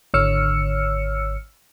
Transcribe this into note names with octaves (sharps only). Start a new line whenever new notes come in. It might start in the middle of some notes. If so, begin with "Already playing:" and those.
G#1 D3 C#5 E6 F6 C#7